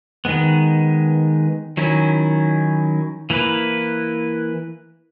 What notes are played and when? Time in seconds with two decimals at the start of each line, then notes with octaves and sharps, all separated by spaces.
0.25 D#3 G#3 B3
1.77 D#3 F#3 C#4 E4
3.30 E3 A#3 E4 B4